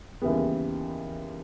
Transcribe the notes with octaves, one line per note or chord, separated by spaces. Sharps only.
D#2 C#3 E3 G3 B3